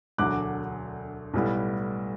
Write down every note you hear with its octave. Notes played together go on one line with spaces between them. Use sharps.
E1 D2 D3 F#3 D6 F#6
B1 A2 G3 B3